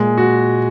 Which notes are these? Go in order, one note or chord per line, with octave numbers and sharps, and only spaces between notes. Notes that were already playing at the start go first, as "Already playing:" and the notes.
Already playing: A#2 G#3
F#4